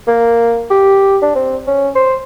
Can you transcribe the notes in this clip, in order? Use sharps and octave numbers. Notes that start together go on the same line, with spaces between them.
A#3
G4
D4
C4
C#4
C5